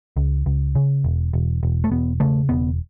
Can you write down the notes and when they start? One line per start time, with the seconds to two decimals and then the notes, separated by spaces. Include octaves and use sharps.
0.17 C#2
0.46 C#2
0.75 C#3
1.04 E1
1.33 E1
1.63 E1
1.84 A3
1.91 E1 B3
2.20 C#3 A3
2.49 E1 B3